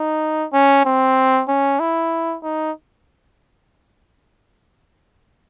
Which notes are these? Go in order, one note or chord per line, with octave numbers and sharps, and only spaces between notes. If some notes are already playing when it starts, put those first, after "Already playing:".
Already playing: D#4
C#4
C4
C#4
E4
D#4